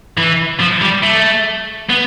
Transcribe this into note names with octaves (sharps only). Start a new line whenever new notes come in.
E3
F3
G3
A3
B3